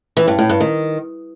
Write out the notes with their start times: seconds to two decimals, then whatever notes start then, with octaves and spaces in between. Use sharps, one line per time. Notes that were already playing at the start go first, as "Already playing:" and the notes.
0.17 E3
0.28 G2
0.39 A2
0.49 G2
0.60 D#3